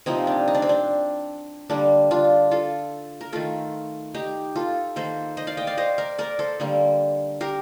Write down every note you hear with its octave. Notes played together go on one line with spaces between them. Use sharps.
C3 F3 A#3 C4 D#4
D4
D#4
D4
C4
D4
D3 G3 A#3 D4
D4 F4
F4 A4
A#4
D#3 A3 F4 A4
D#4 G4
F4 A4
D#3 A#3 A4 C5
C5 D#5
D5 F5
D#5 G5
D5 F5
C5 D#5
A#4 D5
A#4 D5
A4 C5
D3 G3 A#3
G4 A#4